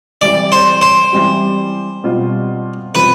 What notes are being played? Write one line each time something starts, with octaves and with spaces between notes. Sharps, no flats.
E3 G3 C4 G4 D5
C5
C5
E3 G3 C4 G4
B2 G3 C4 F4
B2 G3 C4 F4 B4